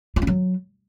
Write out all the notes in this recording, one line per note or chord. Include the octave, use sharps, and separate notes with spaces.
F4
C#4
F#3